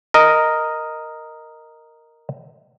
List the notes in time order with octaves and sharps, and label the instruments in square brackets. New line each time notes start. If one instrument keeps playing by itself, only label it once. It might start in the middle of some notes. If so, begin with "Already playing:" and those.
[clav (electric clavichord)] A#4 D#5